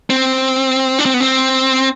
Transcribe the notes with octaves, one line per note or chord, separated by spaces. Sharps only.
C4
D4
C4
B3
C4